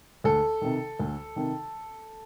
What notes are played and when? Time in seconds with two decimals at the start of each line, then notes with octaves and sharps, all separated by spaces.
0.24 D2 A4
0.62 C3 D#3
1.00 D2
1.36 C3 D#3